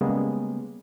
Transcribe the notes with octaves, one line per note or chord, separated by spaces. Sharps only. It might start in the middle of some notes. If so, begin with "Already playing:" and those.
C#3 G3 G#3 A#3 B3